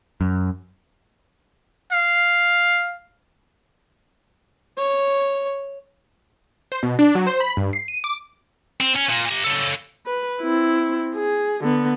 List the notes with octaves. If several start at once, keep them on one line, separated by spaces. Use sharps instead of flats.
F#2
F5
C#5
C5
B2
D4
F#3
C5
B5
G2
C7
D#7
D6
C4
C#4
A#2
G4 A#5
C#3 A4
B4
C4 E4
G#4
D3 B3